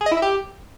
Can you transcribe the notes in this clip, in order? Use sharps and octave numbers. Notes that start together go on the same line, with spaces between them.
G#4
D#5
E4
E5
G4